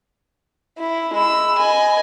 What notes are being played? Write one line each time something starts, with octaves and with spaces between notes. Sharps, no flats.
E4
G#3 B5 E6
D#5 G#5